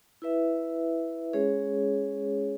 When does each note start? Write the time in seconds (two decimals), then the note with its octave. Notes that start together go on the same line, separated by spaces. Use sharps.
0.22 E4 B4 E5
1.33 G#3 C#4 G#4 C#5